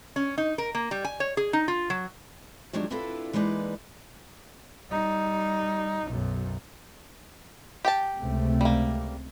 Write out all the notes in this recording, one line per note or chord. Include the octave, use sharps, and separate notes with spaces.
C#4
D#4
A#4
A#3
G3
G#5
C#5
G#4
D#4
F4
F#3
D#3 F3 F#3 G#3 D4 G4
C4 D4 E4 F4 A4 B4
E3 G#3 A#3 D#4 B4 D5
G3 D#4
B1 F#2
G4 G5 A5
C#2 C3 A3
G3 A#3